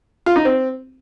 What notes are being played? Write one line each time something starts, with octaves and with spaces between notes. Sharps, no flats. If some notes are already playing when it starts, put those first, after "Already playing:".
F4
D#4
C4